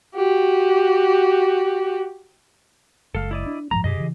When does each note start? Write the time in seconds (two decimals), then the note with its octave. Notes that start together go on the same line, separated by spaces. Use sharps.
0.15 F#4 G4
3.15 F#1 G#3 A4 F5
3.31 E4 D5 D#5
3.46 D4
3.71 G#2 F3 G#3 A#5
3.84 F#2 B2 G4 G#4 D#5
3.97 C#3 E3